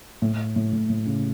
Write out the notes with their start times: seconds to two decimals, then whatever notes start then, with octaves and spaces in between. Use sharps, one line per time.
0.22 A2
0.56 A2
0.73 A2
0.90 A2
1.07 C#3